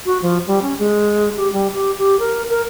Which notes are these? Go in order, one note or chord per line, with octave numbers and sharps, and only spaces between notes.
F#4
F3
G3
C#4
G#3
G4
G3
G4
G4
A#4
A#4